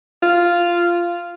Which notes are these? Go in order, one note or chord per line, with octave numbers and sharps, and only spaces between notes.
F4